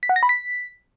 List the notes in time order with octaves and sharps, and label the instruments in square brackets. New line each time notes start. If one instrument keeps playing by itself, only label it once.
[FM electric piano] B6
F#5
A#6
B5
B6